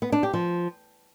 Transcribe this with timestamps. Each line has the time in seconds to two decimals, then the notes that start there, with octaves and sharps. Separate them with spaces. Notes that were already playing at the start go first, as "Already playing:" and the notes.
0.02 B3
0.12 D4
0.23 G4
0.33 F3